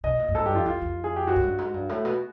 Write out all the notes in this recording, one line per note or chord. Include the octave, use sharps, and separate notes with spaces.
B2 D#5
A#2
G2
G#2 A4
G2 G4
F2 F4
F2 F4
F2
G#4
G4
F#2 F#4
G#2
G2
G#2
G2
A2
B2